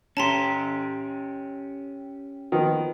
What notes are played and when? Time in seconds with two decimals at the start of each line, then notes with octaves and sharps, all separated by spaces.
0.17 C#4 G4 A5 A#5 C6
2.52 D#3 F3 B3